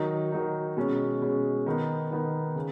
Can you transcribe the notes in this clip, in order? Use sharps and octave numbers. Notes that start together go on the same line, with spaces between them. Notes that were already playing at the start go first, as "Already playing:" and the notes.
Already playing: D#3 F#3 D#4
D#3 F#3 D#4
B2 G#3 C#4
B2 G#3 C#4
D#3 B3 D#4
D#3 B3 D#4
C#3